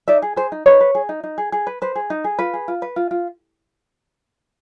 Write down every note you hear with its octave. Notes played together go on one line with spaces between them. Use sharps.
D#4 D5 E5
G#4
G#4 C5
D#4
D#4 B4 C#5
B4
G#4
D#4
D#4
G#4
G#4
B4
B4 C5
G#4
D#4
G#4
F4 B4
G#4
F4
B4
F4
F4